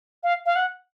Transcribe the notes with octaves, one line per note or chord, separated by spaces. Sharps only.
F5
F5
F#5